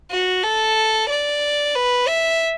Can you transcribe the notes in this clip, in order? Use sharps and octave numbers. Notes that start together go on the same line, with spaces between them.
F#4
A4
D5
B4
E5